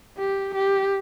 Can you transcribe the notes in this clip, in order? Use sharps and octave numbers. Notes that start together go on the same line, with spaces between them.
G4
G4